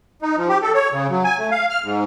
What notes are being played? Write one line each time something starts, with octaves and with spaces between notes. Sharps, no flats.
D#4
F3
G4
A4
C#5
C#3
F#3
G#5
A3
F5
F6
G#2